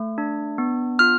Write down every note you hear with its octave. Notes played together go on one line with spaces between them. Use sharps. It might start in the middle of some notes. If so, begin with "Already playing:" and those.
Already playing: A3
D4
B3
F4 F6